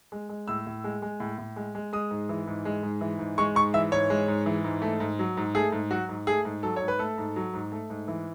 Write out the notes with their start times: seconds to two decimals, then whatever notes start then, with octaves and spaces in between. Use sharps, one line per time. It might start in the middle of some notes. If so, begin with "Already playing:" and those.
0.12 G#3
0.29 G#3
0.48 A2 E6
0.67 A2
0.84 G#3
1.02 G#3
1.20 A2
1.38 A2
1.56 G#3
1.75 G#3
1.93 G#3 D#6
2.11 G#2
2.29 E3
2.47 G#2
2.65 G#3
2.83 G#2
3.01 E3
3.19 G#2
3.38 G#3 C#6
3.55 G#2 C#6
3.74 E3 E5
3.92 G#2 C#5
4.10 G#3
4.28 G#2
4.46 E3
4.64 G#2
4.82 A3
5.00 G#2
5.19 F#3
5.37 G#2
5.55 A3 G#4
5.72 G#2
5.91 F#3 F#4
6.09 G#2
6.27 A3 G#4
6.45 G#2
6.63 F#3 A4
6.76 G#2 C#5
6.88 B4
6.99 A3 A4
7.18 G#2
7.36 F#3
7.54 G#2
7.72 A3
7.90 G#2
8.08 E3